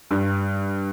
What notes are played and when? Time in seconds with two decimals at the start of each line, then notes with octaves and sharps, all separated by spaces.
0.11 G2